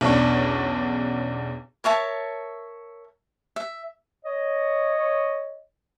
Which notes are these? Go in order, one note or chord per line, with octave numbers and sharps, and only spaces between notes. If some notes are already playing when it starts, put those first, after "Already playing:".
B1 E2 C#4 D4 C#6
A#4 C#5 E5 A5
E5
C#5 D#5